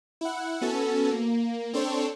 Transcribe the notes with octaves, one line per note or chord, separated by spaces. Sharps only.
E4 F#5
B3 C#4 F#4 A4
A#3
C4 D4 A4 C5 C#5